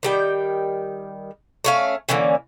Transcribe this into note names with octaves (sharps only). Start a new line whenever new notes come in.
D#3 G3 G5
A3 C#4 F5
D3 E3 A#3 C#4